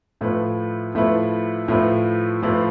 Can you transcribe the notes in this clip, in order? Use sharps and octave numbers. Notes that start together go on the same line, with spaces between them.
A2 F3 A3 E4 B4
A2 F3 A3 E4 B4
A2 F3 A3 E4 B4
A2 F3 A3 E4 B4